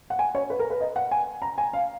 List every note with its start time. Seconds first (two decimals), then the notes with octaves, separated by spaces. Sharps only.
0.10 F#5
0.19 G#5
0.35 C#5
0.50 B4
0.59 A#4
0.70 B4
0.81 D#5
0.96 F#5
1.11 G#5
1.42 A#5
1.58 G#5
1.73 F5